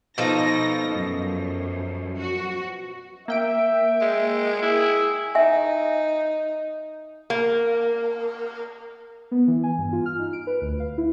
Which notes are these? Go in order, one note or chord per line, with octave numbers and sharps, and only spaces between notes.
B2 F3 D#4 A4 A#6
F#2
F#4
A#3 E5 G5 D7
G#3
E4 G#4
D#4 E5 G#5
A#3
B3
E3
G#5
G2
F4
F6
D#4
D7
B4
D2
F5
E4